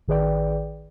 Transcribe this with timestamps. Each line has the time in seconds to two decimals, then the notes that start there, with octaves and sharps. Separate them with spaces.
0.08 A1 D#3 G#4 B4 D5 G5